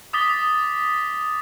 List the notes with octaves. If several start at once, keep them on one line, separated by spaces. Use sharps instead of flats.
D6 D#6 A6 B6 G7